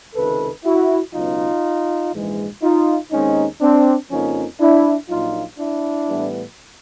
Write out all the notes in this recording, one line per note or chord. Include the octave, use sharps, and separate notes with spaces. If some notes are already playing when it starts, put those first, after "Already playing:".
C#2 C3 D#3 A4 B4
E4 F#4
C#2 B2 F#3 B3 D#4 F4
A#1 G#2 E3 G#3
D#4 F4
D#2 D#3 G#3 C4 C#4 D#4
C4 D4
F2 C#3 F3 A#3 C#4 D#4
D4 E4
A#1 A#2 F#3 D#4 F4
D4 E4
A2 E3 G3 B3